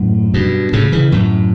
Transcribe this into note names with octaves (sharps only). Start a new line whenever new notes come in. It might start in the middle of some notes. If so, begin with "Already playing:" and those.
Already playing: F#2 A2
G2 B2
A2 C#3
C#3 E3
F#2 A2